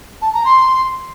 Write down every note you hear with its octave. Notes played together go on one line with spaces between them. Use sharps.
A5
A#5
C6